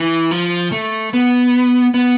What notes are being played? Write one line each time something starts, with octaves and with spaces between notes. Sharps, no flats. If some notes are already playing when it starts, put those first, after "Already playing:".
Already playing: E3
F3
A3
B3
B3